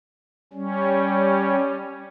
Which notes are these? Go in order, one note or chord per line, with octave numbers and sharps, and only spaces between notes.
G3 C#4